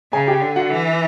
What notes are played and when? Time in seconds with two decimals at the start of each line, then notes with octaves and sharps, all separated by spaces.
0.13 C#3 G#4 G#5
0.27 G4 G5
0.42 D3
0.56 F#4 F#5
0.70 E3